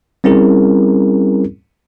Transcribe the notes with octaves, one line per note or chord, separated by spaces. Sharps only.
G3 C4 C#4 E4 G#4 A#4